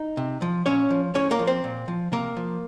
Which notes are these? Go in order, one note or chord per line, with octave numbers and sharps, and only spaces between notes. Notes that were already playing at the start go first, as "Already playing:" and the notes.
Already playing: D#4
C3
F3
A#2 C#4 C#5
F3
A2 C#4 C#5
A#3 A#4
F3
C4 C5
A#2
F3
C3 A#3 A#4
F3